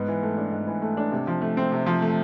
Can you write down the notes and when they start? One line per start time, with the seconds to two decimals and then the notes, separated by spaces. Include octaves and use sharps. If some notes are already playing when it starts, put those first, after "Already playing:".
Already playing: G#2 B3
0.08 E3
0.23 A3
0.38 D4
0.52 G#2
0.67 E3
0.82 A3
0.97 D4
1.12 C3
1.27 F3
1.42 A3
1.57 C4
1.72 C3
1.86 F3
2.02 A3